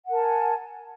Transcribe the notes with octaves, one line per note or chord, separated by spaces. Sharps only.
A#4 F#5 G#5 A5